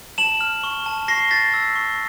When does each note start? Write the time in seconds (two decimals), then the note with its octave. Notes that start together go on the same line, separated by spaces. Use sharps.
0.18 A5 E7 F#7
0.41 F6
0.63 C#6
0.86 A5
1.08 C#6 A#6 C7
1.31 G6 A6 B6
1.54 E6
1.76 C#6